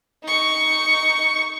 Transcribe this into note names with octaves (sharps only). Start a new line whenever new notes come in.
D#4 C#6